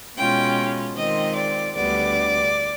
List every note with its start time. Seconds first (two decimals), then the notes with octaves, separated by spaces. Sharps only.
0.17 B2 G#3 C#4 F4 G5
0.95 D#3 G#3 C4 F4 D#5
1.35 D5
1.74 D2 D3 G3 B3 D5